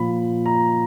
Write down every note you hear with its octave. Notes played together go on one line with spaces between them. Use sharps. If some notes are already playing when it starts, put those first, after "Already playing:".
Already playing: A#2 F3 B5
A#5